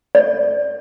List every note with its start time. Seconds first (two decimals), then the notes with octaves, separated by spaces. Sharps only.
0.15 D5